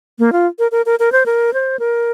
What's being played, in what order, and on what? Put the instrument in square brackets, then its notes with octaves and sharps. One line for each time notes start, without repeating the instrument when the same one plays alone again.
[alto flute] A#3
F4
A#4
A#4
A#4
A#4
C5
A#4
C5
A#4